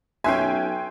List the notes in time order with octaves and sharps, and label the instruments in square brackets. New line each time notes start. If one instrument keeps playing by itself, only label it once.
[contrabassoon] B1 [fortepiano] C#4 E5 [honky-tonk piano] G5 G#5 [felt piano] C6 F#6 C7